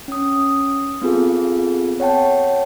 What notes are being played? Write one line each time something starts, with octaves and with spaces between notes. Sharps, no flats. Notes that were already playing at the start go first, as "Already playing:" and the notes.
C#4 D#6
B3 C4 F4 G#4 A4
C#5 F#5 G5 A5